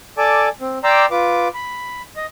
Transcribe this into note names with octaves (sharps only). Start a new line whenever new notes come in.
A4 D5 G#5 A5 D6
C4
D5 G5 A#5 C6 D6 E6
F4 B4 D6
B5
D#5